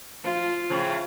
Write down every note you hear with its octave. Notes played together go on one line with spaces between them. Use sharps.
F3 F4
A2 C#3 F3